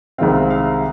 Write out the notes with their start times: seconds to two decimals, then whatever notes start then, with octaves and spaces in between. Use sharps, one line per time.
0.18 C2 C3 D#3 G#3 C4 F5
0.34 F5
0.50 F5